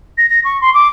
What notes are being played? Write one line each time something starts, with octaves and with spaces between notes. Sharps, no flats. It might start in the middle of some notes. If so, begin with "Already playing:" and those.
A#6
A#6
C#6
C6
D6